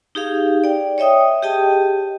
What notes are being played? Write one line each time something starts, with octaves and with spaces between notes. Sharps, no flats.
D#4 G4 G#4 F5
D5 G5
C#5 D#5 E5 G5 D#6
G4 G#4 D#5 G5 A5